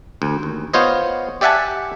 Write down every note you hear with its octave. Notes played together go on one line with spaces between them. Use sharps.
D2
D#2
B3 F4 C5 C#5 D#5
G4 D5 E5 F#5 G#5 A5